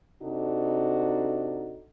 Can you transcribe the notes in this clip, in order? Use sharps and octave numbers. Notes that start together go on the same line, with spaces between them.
C3 D4 D#4 F#4 A4